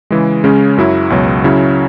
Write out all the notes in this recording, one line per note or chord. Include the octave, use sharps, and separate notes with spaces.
C#3 E3 G#3
C#3 G#3 C#4
F#2 F#3 E4
C#2 B2 F#3
C#3 F#3 C#4 E4